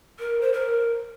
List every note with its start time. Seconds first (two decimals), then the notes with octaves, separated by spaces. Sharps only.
0.19 A#4
0.41 C5
0.53 A#4